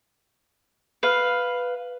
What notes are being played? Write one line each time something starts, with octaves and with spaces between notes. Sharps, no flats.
B4 F5